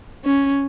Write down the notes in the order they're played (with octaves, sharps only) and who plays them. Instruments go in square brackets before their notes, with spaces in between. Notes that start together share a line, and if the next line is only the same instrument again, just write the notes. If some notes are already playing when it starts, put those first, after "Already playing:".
[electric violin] C#4